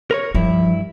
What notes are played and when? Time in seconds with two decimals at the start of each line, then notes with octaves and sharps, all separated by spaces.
0.11 A#4 B4 C#5
0.35 G2 F3 E4